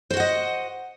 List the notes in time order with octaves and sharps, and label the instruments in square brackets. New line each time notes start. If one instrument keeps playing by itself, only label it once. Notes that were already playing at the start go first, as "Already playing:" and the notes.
[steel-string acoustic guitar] C5
F#4
F#5
D#5